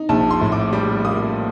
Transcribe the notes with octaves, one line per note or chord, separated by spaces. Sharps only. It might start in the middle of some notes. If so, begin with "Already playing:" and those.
Already playing: D#4
A#1 A5
C6
A2
D6
G3 D6
A#3 D#6